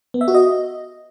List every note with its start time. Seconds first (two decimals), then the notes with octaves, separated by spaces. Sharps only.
0.14 B3
0.21 E5
0.28 F#4
0.35 D#5